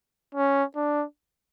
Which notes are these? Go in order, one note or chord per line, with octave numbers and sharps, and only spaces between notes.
C#4
D4